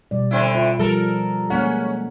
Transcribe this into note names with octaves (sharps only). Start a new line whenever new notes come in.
B2 G3 D5
D3 C4 E4
F4
F3 G3 A4 A#4
G#3 A#3 C#4 F#5